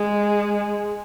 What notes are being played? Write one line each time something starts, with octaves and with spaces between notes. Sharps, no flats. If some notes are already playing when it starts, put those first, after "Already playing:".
Already playing: G#3